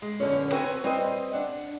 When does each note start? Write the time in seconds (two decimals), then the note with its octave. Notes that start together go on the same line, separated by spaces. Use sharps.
0.02 G#3
0.20 F#2 D3 B3 C#4
0.51 B3 C4 F#4 B4 F5 G#5
0.84 G3 C4 B4 C5 D#5
1.33 D4 F#5